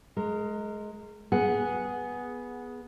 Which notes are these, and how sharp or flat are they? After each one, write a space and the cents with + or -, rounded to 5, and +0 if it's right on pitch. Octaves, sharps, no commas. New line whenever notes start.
G#3 +20 A#4 -20
B3 -10 G#4 +0 F#5 -5